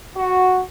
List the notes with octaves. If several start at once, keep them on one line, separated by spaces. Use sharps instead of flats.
F#4